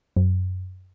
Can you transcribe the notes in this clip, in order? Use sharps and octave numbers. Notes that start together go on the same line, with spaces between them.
F#2